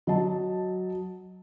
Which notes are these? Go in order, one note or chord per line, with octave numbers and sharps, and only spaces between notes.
F#3 D#5 A5